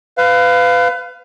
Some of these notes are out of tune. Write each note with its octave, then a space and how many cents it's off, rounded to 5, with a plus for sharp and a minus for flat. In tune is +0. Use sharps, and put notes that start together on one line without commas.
B4 +30 F5 +0